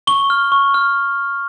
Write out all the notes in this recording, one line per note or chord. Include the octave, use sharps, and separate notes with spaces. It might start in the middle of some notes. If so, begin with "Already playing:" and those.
C#6 G7
F6
C#6
F6